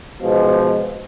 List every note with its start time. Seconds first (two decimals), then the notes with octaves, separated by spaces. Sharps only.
0.21 G#2 B2 F3 G#3